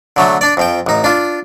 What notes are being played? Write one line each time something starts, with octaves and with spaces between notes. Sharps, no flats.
D3 F#3 A3
D4 D5
F2 F3 G5
A1 D#4
D4 F4